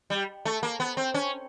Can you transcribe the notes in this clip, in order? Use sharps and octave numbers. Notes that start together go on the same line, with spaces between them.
G3
A3
A#3
B3
C4
C#4